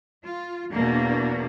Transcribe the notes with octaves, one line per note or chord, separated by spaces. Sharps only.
F4
E2 B2 A#3 D4